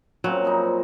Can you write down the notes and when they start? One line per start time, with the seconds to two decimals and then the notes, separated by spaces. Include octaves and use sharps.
0.24 A#2 C#3 F#3 C4
0.45 F3 G3 D#4